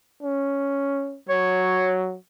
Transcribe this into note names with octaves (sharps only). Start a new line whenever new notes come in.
C#4
F#3 C#5